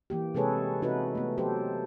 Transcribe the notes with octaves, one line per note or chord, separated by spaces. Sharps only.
E3 A#3 G4
C3 G#3 G#4 A4 B4 C#5
C3 D#4 E4 F#4 B4
A3 B3
F#3 G4 A4 C5